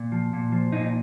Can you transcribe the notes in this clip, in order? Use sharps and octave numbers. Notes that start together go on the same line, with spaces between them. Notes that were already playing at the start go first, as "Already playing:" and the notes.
Already playing: A#2
F3
A#2
F3
A#2 D#4